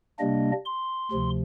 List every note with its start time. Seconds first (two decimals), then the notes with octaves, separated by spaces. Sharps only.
0.19 C3 G3 A#3 D4 D#5
0.65 C6
1.12 D2 C3 F3